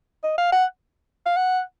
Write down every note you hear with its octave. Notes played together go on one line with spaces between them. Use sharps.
D#5
F5
F#5
F5
F#5